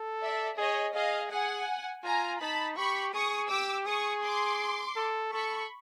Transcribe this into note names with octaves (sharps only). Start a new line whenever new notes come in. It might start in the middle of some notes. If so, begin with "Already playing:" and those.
Already playing: A4
D5 E5
G#4 C#5 D#5
G#4 D#5 F5
G#4 F#5 G#5
F4 G#5 A#5
D#4 A5 B5
G4 B5 C#6
G#4 C#6 D#6
G4 D6 E6
G#4 C#6 D#6
C6 D6
A4
A4 B5 C#6